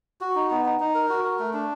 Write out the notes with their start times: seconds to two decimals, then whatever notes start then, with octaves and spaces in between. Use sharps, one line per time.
0.21 F#4
0.35 D#4
0.50 B3
0.65 D#4
0.80 D#4
0.95 A#4
1.09 F#4
1.24 A#4
1.39 A3
1.53 D4